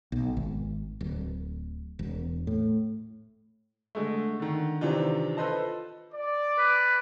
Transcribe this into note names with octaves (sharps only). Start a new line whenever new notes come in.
B1
G#1
D1
E1
A2
D3 G#3 A3
D3 D#3
C3 D#3 E3 D4 F4
F4 A4 B4 C5 D#5 A5
D5
B4